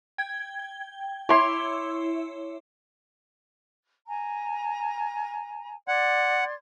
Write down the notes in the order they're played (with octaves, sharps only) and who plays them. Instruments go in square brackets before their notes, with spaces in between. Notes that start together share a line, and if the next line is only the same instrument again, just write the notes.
[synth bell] G5 G#6
[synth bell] E4 C#5 E5 [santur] C6 D6
[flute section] G#5 A#5
[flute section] D5 C6 G#6 [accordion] F#5